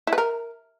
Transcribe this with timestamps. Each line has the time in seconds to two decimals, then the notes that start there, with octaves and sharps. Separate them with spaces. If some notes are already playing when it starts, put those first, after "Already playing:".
0.07 E4
0.13 B4
0.18 A#4